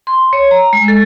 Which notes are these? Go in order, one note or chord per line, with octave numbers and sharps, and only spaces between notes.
C6
C#5
A#5
G#3
A4